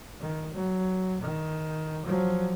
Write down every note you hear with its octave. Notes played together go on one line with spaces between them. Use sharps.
D#3
F#3
D#3
F3 F#3